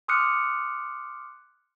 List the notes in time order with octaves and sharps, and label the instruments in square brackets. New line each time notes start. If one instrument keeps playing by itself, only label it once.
[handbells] C6 D6 D#6 F6 F#6 C#7